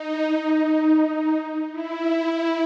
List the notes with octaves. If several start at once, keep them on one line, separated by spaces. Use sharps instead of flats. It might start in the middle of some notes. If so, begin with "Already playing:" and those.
Already playing: D#4
D#4
E4